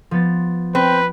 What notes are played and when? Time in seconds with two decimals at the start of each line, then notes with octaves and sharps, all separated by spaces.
0.11 F3 B3 A6
0.75 C4 B4